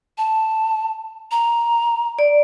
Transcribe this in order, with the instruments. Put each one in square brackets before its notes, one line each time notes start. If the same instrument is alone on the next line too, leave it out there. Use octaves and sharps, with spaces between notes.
[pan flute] A5
A#5
[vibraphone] D5